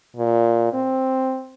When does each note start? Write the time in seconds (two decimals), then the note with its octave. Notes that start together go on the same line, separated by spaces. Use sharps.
0.16 A#2
0.73 C4